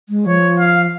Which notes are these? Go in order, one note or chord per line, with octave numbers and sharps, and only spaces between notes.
G#3
F3 C#5
F5